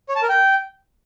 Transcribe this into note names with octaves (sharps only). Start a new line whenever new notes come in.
C#5
A5
A#4
G5